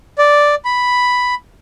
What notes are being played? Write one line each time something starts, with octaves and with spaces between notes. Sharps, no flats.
D5
B5